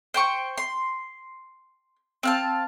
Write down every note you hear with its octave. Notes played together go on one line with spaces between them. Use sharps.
C5 G5 C#6
C6
C4 F5 A5